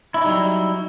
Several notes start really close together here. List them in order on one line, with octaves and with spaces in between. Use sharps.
E4 C#4 D#4 G3 F#3